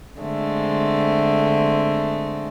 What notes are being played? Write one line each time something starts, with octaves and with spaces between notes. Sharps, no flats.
D3 G#3 A3 C4